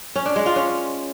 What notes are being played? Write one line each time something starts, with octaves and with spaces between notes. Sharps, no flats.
C#4
D4
G#3
F4
C#4